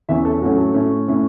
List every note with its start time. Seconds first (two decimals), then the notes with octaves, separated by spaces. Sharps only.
0.09 E2 E3 C#4 E5
0.25 A4
0.41 A2 F#3 A3 C#4 F#4
0.58 A4
0.74 A2 A3 C#4
1.08 A2 A3 C#4